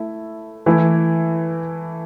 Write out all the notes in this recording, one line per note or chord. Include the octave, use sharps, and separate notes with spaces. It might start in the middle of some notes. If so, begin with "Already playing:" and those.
Already playing: A3 E4 A4 E5
E3 A3 E4